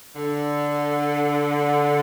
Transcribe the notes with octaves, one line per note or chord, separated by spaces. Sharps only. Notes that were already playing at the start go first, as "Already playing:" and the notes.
D3